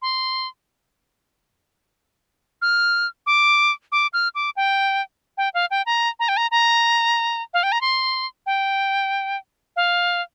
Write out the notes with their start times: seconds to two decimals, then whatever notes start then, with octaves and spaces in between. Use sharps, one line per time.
0.02 C6
2.62 F6
3.26 D6
3.92 D6
4.13 F6
4.35 D6
4.57 G5
5.38 G5
5.54 F5
5.71 G5
5.86 A#5
6.20 A#5
6.29 G5
6.37 A#5
6.51 A#5
7.54 F5
7.63 G5
7.72 A#5
7.81 C6
8.46 G5
9.76 F5